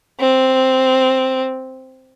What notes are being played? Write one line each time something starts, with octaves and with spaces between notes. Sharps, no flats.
C4